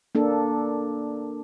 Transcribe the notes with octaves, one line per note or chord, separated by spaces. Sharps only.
A#3 D4 A4